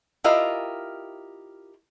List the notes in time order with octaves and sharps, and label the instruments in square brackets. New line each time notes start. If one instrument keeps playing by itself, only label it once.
[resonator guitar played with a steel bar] E4 F4 G4 A#4 D#5 F5